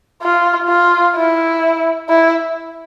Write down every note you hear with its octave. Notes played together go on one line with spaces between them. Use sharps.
F4
F4
E4
E4